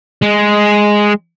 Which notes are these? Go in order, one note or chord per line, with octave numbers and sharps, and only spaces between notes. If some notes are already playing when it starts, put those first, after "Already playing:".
G#3